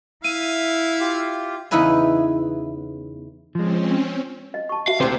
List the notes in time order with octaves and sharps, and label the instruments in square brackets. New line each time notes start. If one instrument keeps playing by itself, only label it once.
[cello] E4 [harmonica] E5 F5 [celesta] D#7
[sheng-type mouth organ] F4 G4
[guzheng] E2 C#3 D#4 E4 B4 G#5
[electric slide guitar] F3 G#3 [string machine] C4 C#4
[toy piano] D#5
A5 C#6
[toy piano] F#4 E5 [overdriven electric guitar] F5
[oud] D2 C5 [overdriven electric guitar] C3